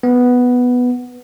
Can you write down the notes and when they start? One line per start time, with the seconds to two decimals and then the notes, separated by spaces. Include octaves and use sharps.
0.03 B3